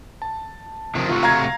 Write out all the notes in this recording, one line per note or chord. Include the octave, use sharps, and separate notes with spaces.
A5
C3 D#3 F3
C3 A3 F4 F#4
F5 A#5 G#6